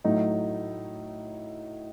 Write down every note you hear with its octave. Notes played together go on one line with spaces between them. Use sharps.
A2 F#3 A3 D#4